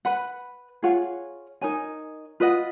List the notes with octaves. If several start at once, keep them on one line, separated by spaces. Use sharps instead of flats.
B4 F#5 B5
F4 G#4 C#5 F#5
D#4 A#4 C#5 G#5
F4 B4 D#5 F#5